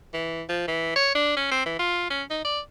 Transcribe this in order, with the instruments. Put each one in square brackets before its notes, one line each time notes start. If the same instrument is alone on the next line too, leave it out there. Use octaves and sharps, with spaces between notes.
[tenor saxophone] E3
F3
E3
C#5
D4
C#4
C4
E3
F4
C#4
D#4
D5